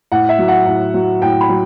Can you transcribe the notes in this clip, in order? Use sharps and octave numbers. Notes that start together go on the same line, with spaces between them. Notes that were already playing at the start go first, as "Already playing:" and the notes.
A2 F#5
E5
F#3
F#5
A2
F#3
A2 G5
B5
F#3